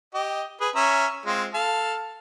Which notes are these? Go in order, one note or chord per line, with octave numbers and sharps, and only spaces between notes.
G4 D#5
G#4 B4
C#4 E5 A#5
G#3 C4 F4
A4 F5 A5